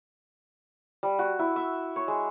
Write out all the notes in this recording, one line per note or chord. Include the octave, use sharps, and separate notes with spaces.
G3
F#4
E4
E5
C#5
G#3